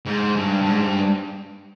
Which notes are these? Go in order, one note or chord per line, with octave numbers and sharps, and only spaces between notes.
G#2
G2
G2
G#2
G2